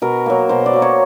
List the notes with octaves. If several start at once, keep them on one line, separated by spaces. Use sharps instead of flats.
B2 A#4
F#3 A#3
B2 C5
D5
F#3 A#3
C#5